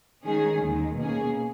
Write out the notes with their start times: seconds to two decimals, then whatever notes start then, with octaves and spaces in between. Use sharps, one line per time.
0.24 D#3 G#3 C#4 G#4
0.60 D#2 D#3 G#3
0.97 B2 A#3 C#4 G#4